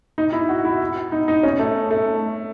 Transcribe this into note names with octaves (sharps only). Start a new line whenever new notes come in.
D#4
E4
F#4
E4
D#4
D#4
C#4
A3
A3